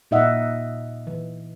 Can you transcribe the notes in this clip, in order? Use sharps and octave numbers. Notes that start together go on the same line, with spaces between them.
A#2 D#4 D#5 E5 F#5
E3